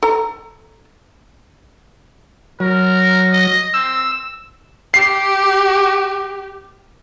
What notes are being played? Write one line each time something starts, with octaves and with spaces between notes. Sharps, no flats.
A4 A#5
F#3 A#4
D#5
C4 E6
G4 C7